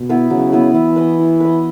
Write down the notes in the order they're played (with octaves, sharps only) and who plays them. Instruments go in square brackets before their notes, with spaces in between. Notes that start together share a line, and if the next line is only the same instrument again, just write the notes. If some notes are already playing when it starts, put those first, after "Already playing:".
Already playing: [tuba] B2
[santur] B3 E4 B4
[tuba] C#3 [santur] F#3
[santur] B3 E4 B4
[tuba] E3 [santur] E4
[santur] B4 D#5
E4
B4 D#5